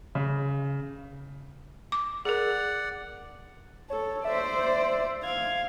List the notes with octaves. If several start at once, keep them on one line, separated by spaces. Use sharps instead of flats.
C#3
D6
G#4 A#4 D5 F#5
A4 C#5
C5 D5 E5
F5 G#6